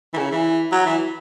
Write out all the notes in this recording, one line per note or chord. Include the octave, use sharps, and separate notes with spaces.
E3
C#3
E3
F#3
E3